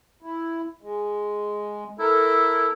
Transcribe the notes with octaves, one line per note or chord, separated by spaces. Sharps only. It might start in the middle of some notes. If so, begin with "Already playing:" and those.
E4
G#3
E4 A4 A#4